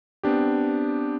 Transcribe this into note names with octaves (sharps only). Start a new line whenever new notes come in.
B3 C4 D4 G4